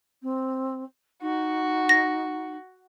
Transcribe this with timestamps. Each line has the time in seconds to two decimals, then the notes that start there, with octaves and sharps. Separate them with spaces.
0.23 C4
1.22 D#4 F#4
1.89 A#6